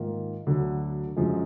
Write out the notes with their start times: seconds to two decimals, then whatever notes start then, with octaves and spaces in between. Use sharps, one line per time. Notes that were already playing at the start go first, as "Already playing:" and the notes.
Already playing: G#2 D#3 A#3 F4 A#4
0.47 D2 D3 F#3
1.16 F#2 D3 F3 G#3